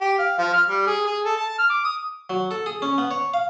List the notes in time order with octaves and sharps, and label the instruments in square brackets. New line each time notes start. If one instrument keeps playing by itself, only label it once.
[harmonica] G4
F5
F3
F6
G3
G#4
G#4
A4
A5
F6
D6
D#6
[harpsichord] F#3
A4
G#4
C#4
B3
C#5
F5